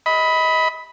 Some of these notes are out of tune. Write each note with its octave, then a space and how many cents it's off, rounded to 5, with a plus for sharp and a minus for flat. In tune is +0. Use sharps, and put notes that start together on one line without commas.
D#5 +30 B5 +0